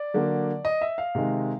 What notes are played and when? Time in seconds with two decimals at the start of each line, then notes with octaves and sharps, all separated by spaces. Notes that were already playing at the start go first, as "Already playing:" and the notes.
Already playing: D5
0.14 D3 F#3 A#3
0.65 D#5
0.81 E5
0.98 F5
1.15 C3 D#3 G#3